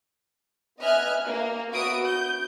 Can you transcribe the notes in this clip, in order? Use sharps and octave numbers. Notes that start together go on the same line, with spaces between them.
B3 D#5 E5 G#5 F6 F#6
A#3
B3 F#4 E5 D#6 D7
G6